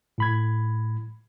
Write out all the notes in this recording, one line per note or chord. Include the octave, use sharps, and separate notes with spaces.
A2 B5 G#6